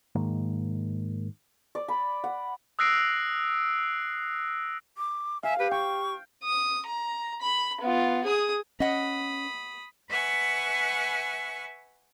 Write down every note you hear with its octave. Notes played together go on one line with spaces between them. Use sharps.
G#2 D#3 G#3 A#3
D5
B5
F#5
D#6 E6 F#6 A#6 C7 D7
D6
E5 F5 G#5
G4 B4
G5 C#6
D#6
A#5
B5
B3 F4
G#4 D#6
C#4 D#5 F#5 B5 D#6
B4 E5 F#5 G#5 C#6